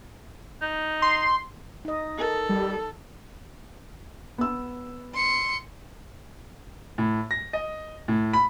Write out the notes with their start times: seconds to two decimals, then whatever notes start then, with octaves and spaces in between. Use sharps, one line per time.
0.62 D#4
1.02 C6
1.85 D#4 D#5
2.18 A4 A#4
2.49 G3
4.38 B3 E6
5.14 C6 C#7
6.98 A2
7.31 A#6
7.53 D#5
8.08 A2
8.33 B5